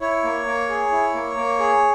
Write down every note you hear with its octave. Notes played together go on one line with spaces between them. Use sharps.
E4 C#5
A#3
A#3
G#4
E4
A#3
A#3
G#4